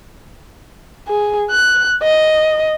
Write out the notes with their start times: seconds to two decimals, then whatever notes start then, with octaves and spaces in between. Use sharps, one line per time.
1.08 G#4
1.51 F#6
2.03 D#5